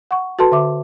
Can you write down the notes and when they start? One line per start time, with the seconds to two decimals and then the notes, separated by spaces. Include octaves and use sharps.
0.11 F#5 C#6
0.39 F#4 A4 B4 A5 C6
0.52 D3 E5 D6